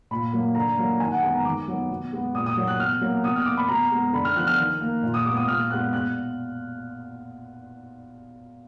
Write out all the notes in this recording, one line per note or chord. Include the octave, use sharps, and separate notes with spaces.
A#2 B5
F#3 A#3
D3 A#5
F#3 A#3
D#3 G#5
F#5
G#3 B3 G#5
A#5
D#3 D6
F#3 B3
B2
G#3 B3
A#2 D#6
D#6
F#3 A#3
F#6
B2 F6
F#3 A#3
B2 D#6
F6
A#3 D6
B5
B2 A#5
G#3 B3
D3 B5
F6
F3 B3 F#6
F6
D#3
A#3
A#2
D#6
G#3 B3 D6
D#6
A#2 F6
G#3 B3 F#6
B2 F#6